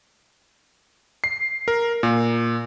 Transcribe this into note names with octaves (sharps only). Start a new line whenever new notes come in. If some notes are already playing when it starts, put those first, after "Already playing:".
C7
A#4
A#2